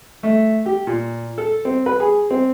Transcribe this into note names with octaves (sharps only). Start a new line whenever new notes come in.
A3
G4
A#2
A4
C4
B4
G#4
C4